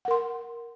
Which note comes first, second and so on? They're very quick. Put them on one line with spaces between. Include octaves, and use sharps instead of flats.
F#5 A#4 C6